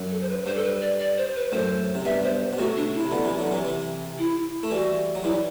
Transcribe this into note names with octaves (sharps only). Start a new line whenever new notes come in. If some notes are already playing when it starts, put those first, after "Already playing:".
Already playing: F#2
A4
C5
B4
G2 C5
A4
B4
D5
D5
C5
B4
F#2 A2 C5
C3
G2 B2 E5
C5
B2
A2 C3 F#4
D4
E4
C3
B2 D3
C3 E3
D3 F#3
C3 E3
C3 E3
E4
A3
E3 G3 F#4
F#3
E3 G3 E4